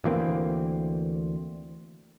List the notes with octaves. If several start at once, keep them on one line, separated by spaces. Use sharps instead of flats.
D2 E3 A#3 C4